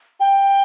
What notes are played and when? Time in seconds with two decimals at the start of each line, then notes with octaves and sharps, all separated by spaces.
0.20 G5